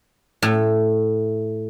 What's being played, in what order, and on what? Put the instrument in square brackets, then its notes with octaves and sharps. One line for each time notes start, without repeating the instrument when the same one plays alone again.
[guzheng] A2